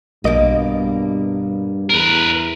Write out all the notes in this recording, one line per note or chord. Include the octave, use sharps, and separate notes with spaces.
B1 G2 B2 A#3 D#5 D7
E2 A#4 B4